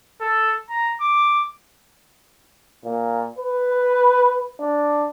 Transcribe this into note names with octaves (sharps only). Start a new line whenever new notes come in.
A4
A#5
D6
A#2
B4
D4